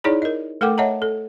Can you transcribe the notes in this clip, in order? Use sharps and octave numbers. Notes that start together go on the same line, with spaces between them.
D#4 E4 G#4 C#5 D5 A#5
A#4 D#5
A3 A4 A#4 F#5 G5 D6
C#5 D#5 E5 F#5 A5 A#5
A4